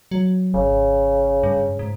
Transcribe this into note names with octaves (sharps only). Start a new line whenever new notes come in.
F#3
G#1 C#3
G2
G#2